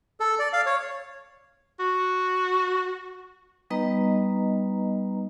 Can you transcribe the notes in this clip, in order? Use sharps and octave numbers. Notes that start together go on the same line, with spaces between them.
A4
D5
F5
C#5
F#4
G3 B3 D#4 B4 D#5 A#5